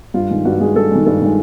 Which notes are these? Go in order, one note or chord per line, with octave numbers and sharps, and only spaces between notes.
G2 F4
D#3 G#3
G2 F#4
D#3 G#3 G#4
G2 A4
D#3 G#3
G2 A4
D#3 G#3